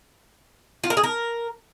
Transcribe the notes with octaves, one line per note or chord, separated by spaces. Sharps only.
F4
A#4
G#4
A#4